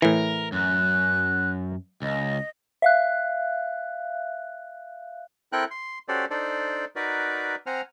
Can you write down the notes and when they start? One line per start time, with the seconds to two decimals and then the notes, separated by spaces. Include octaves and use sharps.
0.02 A2 E3 A#4
0.52 F#2 F#6
2.02 C#2 D#5
2.82 E5 F5 F#6
5.52 C4 E4 A4 A#4 G5 F#6
5.71 C6
6.08 C#4 F#4 G4 A4 C5 D5
6.30 D4 D#4 A4 C5 D5
6.96 D#4 F#4 A#4 B4 D5
7.66 C4 C5 F#5 G#5 A#5 F6